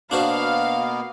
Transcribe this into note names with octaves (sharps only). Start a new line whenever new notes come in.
B2 A#3 B3 D4 F#4 C5 F5